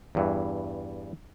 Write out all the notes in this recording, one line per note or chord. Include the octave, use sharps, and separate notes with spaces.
E2 G2 E3